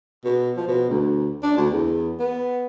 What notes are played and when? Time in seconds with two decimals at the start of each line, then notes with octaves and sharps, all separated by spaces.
0.25 B2
0.56 F3
0.68 B2
0.90 D2
1.43 D4
1.57 D2
1.70 E2
2.19 B3